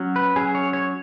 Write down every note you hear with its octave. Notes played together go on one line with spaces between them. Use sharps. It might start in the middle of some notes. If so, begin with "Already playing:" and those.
Already playing: F#3 C#4
B4
F#3 C#4 G#4
C#5
C#5